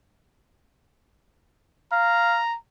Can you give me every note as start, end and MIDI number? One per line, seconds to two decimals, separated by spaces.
1.92 2.38 77
1.92 2.56 82